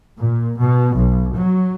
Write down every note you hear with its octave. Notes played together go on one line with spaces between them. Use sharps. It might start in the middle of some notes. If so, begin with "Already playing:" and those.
A#2
B2
B1
F#3